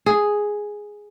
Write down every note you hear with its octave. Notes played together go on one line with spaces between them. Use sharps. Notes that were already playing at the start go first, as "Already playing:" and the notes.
G#4